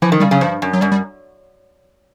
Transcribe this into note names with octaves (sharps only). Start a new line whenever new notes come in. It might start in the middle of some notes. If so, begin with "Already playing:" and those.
E3 F3
D#3
C#3 G3
C#3 F#3
G2 F3
F#2
F#3
F#2 G3
G3